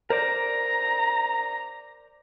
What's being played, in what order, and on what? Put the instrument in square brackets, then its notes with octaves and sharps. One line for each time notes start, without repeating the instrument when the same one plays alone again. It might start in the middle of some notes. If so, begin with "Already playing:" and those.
[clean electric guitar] A#4 C5 D5 [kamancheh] A#5